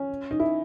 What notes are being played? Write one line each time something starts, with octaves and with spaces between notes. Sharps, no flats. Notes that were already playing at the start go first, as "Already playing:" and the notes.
Already playing: C#4
D#4
E4